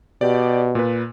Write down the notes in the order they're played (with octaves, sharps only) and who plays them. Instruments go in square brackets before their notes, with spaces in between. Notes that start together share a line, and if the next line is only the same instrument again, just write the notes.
[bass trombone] B2 [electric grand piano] G4 D5
[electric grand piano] A#2 B4